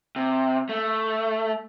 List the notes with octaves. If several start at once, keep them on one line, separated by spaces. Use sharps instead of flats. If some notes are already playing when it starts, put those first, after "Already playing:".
C3
A3